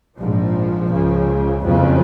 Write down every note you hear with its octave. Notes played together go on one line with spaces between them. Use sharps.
A#1 G#2 F3
C#2 C#3
F#1 F2 C#3